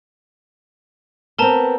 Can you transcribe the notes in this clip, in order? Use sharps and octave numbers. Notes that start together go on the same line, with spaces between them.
B3 C4 A#4 A5 A#5